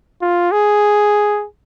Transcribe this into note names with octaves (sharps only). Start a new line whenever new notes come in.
F4
G#4